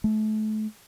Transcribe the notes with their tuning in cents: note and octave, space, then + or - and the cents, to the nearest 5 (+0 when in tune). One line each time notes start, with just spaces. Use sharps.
A3 -30